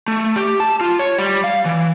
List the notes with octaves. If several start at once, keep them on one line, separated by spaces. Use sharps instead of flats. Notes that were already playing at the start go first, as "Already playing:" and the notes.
A3
G4
A5
F4
C#5
G3
F5
E3